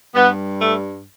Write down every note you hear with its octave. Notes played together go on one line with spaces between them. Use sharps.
G2 G3 B3
A3